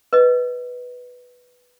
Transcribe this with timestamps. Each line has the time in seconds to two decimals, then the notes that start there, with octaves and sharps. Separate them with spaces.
0.13 B4 D#5